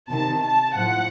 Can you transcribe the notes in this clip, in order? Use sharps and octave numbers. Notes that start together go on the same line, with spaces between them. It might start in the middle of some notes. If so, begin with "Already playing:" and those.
C3 D#3 A5
A5
A2 F3 F#5